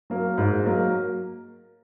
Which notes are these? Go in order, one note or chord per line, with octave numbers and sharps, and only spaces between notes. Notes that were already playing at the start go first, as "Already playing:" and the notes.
F#3 A#3
G#2
F#3 A#3